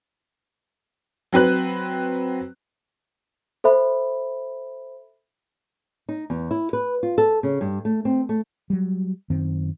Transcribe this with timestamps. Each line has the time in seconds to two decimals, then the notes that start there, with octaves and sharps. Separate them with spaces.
1.33 F#3 C4 B4 F#6
3.64 A4 C5 E5 B5
6.09 D#4
6.30 E2
6.51 E4
6.73 B4
7.03 F4
7.18 A4
7.43 C#3
7.61 G2
7.85 A3
8.05 C4
8.29 A3
8.70 F#3 G3
9.30 F#2 D#3 C4